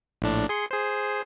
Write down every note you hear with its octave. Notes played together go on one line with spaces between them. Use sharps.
A#1 A2 D4
G#4 C6 C#7
G#4 C5